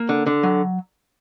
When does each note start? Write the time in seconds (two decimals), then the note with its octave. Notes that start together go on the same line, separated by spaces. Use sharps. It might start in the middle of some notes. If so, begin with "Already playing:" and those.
Already playing: A#3
0.09 D3
0.26 D3
0.43 F#3